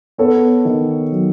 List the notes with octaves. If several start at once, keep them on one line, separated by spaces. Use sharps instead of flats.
B3 A4 C#5
D#3
F#3